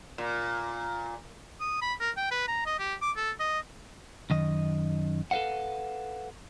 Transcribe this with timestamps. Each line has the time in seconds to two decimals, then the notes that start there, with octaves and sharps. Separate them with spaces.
0.18 A#2
1.61 D#6
1.82 B5
2.00 A#4
2.17 G5
2.31 B4
2.48 A#5
2.66 D#5
2.79 G4
3.02 D6
3.16 A4
3.40 D#5
4.30 F#2 D#3 D#5
5.31 A4 B4 C5 F5 F#5